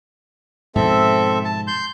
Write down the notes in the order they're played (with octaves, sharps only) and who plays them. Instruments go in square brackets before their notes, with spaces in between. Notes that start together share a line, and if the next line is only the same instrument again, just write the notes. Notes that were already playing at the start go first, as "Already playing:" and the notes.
[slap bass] G#2 B2 F3 [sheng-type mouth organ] C4 A4 E5
[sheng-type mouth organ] A5
C6 G6